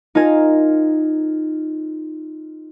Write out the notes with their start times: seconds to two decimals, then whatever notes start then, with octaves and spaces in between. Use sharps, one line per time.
0.15 D#4 F4 A#4 D#5 G#5